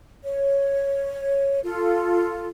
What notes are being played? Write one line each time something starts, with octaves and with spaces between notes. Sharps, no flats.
C#5
F4 A4